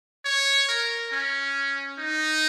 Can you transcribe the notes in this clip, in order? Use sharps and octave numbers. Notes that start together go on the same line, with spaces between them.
C#5
A#4
C#4
D#4